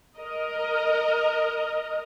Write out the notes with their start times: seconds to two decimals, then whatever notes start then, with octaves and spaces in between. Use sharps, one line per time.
0.17 A#4 D#5